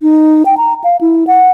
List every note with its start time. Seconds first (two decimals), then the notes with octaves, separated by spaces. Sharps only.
0.02 D#4
0.46 G5
0.57 A#5
0.84 F5
1.01 E4
1.27 F#5